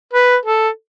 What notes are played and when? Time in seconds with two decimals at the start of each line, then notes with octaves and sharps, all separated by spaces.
0.13 B4
0.46 A4